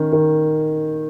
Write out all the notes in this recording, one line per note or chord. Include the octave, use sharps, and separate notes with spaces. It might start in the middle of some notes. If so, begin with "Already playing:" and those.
Already playing: D#3 C#4
D#3